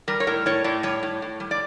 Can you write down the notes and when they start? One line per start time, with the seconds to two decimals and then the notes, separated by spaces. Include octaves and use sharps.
0.08 G3 A#4
0.20 C#5
0.27 A2 A#4
0.46 A2 C#5
0.64 A2 D5
0.83 G3 C#5
1.03 A2
1.22 A2
1.40 G3
1.51 D5